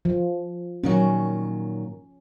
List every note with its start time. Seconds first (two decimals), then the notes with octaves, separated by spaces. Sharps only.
0.05 F3
0.83 A#2 D#3 F#3 C#4